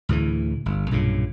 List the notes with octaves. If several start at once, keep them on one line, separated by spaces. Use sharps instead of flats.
D2 A2 C#3 E3
G1
B1 G2 A#2 C#3